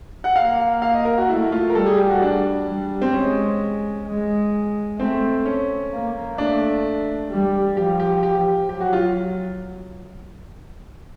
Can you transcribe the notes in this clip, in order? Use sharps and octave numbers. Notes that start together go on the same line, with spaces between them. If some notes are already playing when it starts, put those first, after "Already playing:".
F#5
A#3 F5
F5
D#5
A#4
F#4
A3 E4
F4
A#4
G3 A4
G#4
G4
F#4
D4
G3
C4
G#3 C#4
G#3
A3 C4
C#4
A#3
A3 D4
G3
F3 G4
G4
G4
F#3 G4
F#4
F4